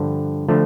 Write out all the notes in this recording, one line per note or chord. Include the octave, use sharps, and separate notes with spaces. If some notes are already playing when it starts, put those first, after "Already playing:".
Already playing: G2 D3 F3
D3 F3 A3